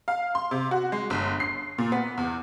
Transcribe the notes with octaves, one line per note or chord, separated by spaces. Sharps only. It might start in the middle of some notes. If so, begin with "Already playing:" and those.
F5
C6
C3
F#4
G#3
G1
C7
A#2
B3
E2